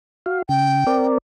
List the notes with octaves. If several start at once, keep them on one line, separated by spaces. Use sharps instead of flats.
F#4 F5
C#3 G5
C4 A#4 D5